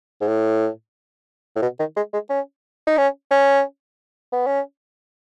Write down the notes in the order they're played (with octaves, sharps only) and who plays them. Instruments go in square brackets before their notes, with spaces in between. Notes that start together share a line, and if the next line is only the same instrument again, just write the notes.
[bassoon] G#2
A2
A2
B2
D#3
G#3
G#3
C#4
D#4
C#4
C#4
B3
C#4